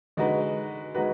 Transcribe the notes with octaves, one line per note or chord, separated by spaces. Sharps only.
D3 G#3 D#4 F#4 B4
G#3 D#4 F#4 B4